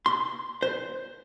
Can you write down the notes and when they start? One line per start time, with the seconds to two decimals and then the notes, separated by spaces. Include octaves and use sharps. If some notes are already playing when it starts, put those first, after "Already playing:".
0.06 C6
0.63 C5